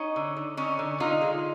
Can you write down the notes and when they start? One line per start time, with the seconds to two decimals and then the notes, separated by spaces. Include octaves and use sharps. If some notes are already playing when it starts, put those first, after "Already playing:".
Already playing: C#4 D#4
0.16 D3
0.37 D3
0.57 D3 C#4 D#4
0.79 D3
1.00 D3 D#4 F4
1.21 G#3